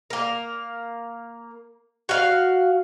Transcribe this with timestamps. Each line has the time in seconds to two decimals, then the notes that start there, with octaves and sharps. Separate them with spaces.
0.10 A#3 A#4
2.09 F#4 F5